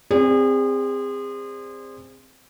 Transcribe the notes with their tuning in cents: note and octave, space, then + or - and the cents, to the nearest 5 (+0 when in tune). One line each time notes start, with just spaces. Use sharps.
C4 +0 G#4 -35 D5 +0